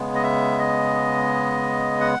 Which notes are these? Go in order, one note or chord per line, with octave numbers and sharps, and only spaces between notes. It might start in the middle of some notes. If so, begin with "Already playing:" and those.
Already playing: C#3 G#3 B3
D#5
E5
D#5
F#5